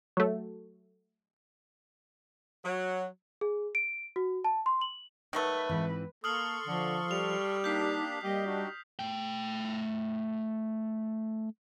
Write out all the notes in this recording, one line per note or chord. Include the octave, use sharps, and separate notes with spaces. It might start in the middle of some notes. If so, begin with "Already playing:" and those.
F#3 A3
F#3
G#4
D7
F#4
A5
C6
F#7
D#3 F#3 A3 B4
G#2 E3 C4
A#3 A4 C6 C#6 D#6 F6 F#7
D3 F3
G3 F7
A#3 D4 D#4 G4 G6 B6 C7
G3 A#3 G4 D#5
D4 D#4 F#4
A3 G5